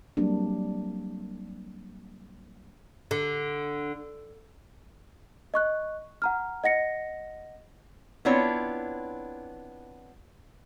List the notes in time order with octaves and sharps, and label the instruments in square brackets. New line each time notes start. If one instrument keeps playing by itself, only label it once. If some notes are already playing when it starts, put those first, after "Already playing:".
[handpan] F#3 G3 A#3 C4 D4
[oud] D3
[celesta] D#5 C#6 F#6
F#5 A#5 F6
D#5 F#5 A#6 C#7
[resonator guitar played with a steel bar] B3 C4 D4 E4 F4 C#5